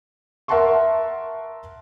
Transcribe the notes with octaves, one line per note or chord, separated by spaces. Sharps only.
A#4 E5 F#5 A5 C6 C#6